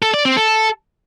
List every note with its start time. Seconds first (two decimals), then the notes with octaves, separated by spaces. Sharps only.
0.02 A4
0.14 D5
0.25 C4
0.37 A4